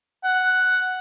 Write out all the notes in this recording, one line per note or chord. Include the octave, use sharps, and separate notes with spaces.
F#5